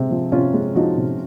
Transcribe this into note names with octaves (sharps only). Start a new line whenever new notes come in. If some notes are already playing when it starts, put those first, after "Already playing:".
Already playing: C3 G#3 C4
F3
C3 C#4 F4
G#3
F3 D#4 F#4
C3